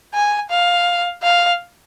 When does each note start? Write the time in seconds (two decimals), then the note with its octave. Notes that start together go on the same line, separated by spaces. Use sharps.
0.14 G#5
0.50 F5
1.23 F5